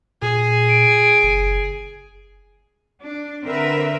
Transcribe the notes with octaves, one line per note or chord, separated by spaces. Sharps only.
A#2 G#4
D7
F#1
D4
D3 C4 A#4 B4 E5